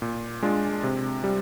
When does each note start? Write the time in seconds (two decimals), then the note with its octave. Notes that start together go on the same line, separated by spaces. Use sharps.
0.02 A#2
0.42 G#3 D4 F4
0.83 C3
1.24 G3